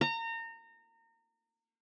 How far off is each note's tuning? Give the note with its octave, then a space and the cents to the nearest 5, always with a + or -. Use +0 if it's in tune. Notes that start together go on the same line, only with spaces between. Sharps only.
A#5 -30